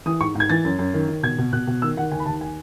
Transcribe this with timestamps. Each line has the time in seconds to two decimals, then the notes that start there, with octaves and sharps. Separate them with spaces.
0.06 E3 D#6
0.20 G#2 C#6
0.35 G#2
0.40 G#6
0.50 E3 A6
0.64 F#2
0.79 F#2
0.94 D#3
1.08 D#3
1.23 B2 G#6
1.38 B2
1.53 B2 F#6
1.67 B2
1.82 D#3 E6
1.97 D#3 F#5
2.12 D#2 G#5
2.20 B5
2.26 D#2 A5
2.41 G#5